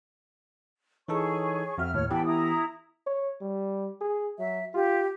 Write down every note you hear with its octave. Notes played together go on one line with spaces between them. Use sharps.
E3 D#4 G#4 A4 C#5 C#6
F2 F#4 E5 F6
D#2 A2 C#5 F6
E3 B3 G4 G5 A5 B5
E4 A#5 D#6
C#5
G3
G#4
F#3 E5
F4 G4